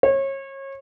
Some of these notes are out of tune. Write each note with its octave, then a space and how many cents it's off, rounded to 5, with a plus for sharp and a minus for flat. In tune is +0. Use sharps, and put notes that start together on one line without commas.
C#5 -30